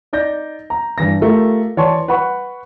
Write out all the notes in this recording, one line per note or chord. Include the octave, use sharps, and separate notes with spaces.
D#4 D5 G6 A#6
A#5
G2 E3 A#6
A3 F4 G4 A#4
E3 C#5 D5 A5 C6 C#6
B4 F#5 B5 C#6